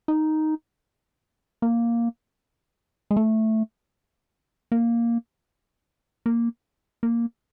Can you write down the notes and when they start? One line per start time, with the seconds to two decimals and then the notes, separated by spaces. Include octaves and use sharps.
0.08 D#4
1.62 A#3
3.11 G#3
3.17 A3
4.72 A#3
6.26 A#3
7.03 A#3